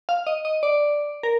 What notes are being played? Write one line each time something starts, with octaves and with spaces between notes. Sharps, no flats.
F5
D#5
D#5
D5
A#4